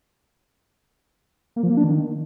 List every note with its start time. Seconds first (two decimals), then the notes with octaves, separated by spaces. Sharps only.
1.56 A#3
1.63 F3
1.70 A#3
1.77 D4
1.84 D#3